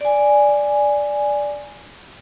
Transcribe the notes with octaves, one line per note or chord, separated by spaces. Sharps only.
D5 G#5